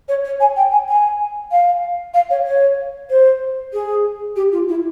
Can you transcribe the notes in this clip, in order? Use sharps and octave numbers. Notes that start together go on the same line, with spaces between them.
C#5
C#5
G#5
G5
G#5
G#5
F5
F5
C#5
C#5
C5
G#4
G4
F4
E4